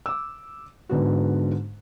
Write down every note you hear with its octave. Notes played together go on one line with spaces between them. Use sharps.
D6 E6
G#2 D3 B3 F#4